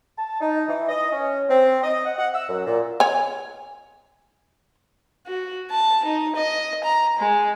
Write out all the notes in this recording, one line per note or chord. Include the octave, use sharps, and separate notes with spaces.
A5
D#4
E3
D#5
C#4
C4
D#5
F#5
F#5
E6
F#2
A#2
C#5 G#5
F#4
A5
D#4
D#5
A#5
G#3